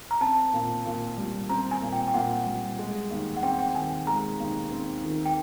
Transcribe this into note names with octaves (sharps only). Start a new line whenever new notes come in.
A#5
C4 A5
A#2
A#2
G3
C4 A#5
G#5
A#2
G5
G5
A#2 F#5
G3
G#3
D#2
F#5
C4 G5
G5
D#3 G#5
G#3 A#5
D#2
C4
D#3
G5